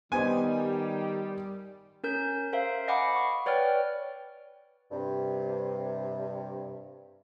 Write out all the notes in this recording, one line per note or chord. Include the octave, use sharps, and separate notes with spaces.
D#3 G3 B3 C5 D#5 G#5
C#4 A#4 G6
A#4 C5 E5 F5
D#5 F5 F#5 G#5 B5 D6
C#6
B4 C#5 D5 G5 F6
G2 C3